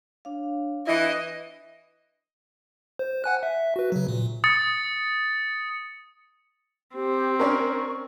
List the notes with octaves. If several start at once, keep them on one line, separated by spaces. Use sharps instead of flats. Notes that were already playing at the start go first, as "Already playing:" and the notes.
D4 C#5 F5
E3 E4 D#5
C5
F#5 G#5 F#6
E5
F#4 B4
C#3 F#3
A#2
D#6 A6 C#7
C4 G4
C#4 D4 A#4 C#6